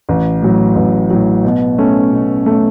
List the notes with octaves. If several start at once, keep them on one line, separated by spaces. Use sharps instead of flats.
A1
A2 F#3
A1
A2 F#3
B2
A3 C#4
B2
A3 C#4